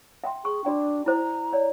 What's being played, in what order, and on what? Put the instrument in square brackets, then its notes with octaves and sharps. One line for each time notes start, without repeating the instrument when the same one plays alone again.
[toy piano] E5 G5 C6
[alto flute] G#4 [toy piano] C#6
[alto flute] D4 [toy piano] F#4 D5 G5
[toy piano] E4 C5 [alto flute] A#5
[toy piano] C#5 D5